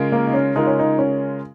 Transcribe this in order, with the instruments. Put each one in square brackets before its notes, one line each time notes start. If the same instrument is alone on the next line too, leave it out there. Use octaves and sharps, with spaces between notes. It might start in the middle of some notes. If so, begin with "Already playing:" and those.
Already playing: [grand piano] C#3 G#3 F4 A#4
[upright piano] A#3
D#4
C#4
[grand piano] C#3 G#3 F4 A#4 [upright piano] D#4
[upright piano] C#4
D#4
C#4